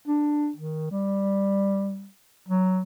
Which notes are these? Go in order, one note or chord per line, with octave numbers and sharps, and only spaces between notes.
D4
D#3
G3
F#3